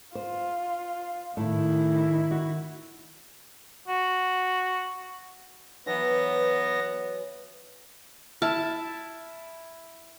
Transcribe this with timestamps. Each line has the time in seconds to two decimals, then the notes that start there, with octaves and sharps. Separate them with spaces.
0.15 F4 C5
1.37 A2 D#3 E4
2.31 F#4
3.88 F#4
5.86 E3 F#3 B3 E5 A#6
8.42 E4 A5 F6